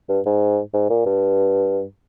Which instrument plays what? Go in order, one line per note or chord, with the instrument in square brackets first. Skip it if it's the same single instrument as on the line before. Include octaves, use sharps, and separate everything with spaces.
[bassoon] G2
G#2
G#2
A#2
G2